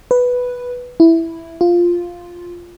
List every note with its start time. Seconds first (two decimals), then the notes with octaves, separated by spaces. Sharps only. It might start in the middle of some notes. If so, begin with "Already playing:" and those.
0.11 B4
1.00 E4
1.61 F4